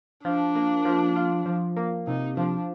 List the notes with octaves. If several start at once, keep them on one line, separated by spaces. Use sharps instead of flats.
F3 D4
A#3
F3
F4
F3
A#3
C3 D#4
F3 D4